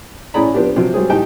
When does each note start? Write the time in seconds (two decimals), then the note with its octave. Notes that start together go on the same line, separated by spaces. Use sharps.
0.34 A2 C#4 G#4 D5 A#5 B5
0.54 F3 B3 C4 D4 G4
0.76 C3 F3 F#3 C4
0.94 F#3 G3 C4 G#4
1.10 A2 D#4 G4 G5 A5